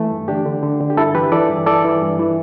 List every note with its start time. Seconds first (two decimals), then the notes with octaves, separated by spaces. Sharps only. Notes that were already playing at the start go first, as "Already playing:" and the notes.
Already playing: E3 A3
0.11 G2
0.28 D3 D4 G4
0.46 D3
0.63 D3
0.80 D3
0.90 G4
0.97 G2 E4 A4
1.14 E3 G4 B4
1.32 E3 A4 D5
1.49 G2
1.66 E3 A4 D5
1.84 E3
2.02 G2
2.19 E3